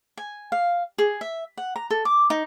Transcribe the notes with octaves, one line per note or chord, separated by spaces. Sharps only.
G#5
F5
G#4
E5
F#5
A#5
A4
D6
D#4